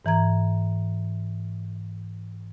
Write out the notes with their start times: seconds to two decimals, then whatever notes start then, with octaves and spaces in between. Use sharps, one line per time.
0.05 G#2 E3 A#5 G#6